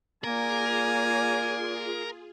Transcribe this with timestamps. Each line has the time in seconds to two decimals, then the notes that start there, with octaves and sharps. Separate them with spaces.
0.24 A#3 F4 G#4 A#4 D5 G#5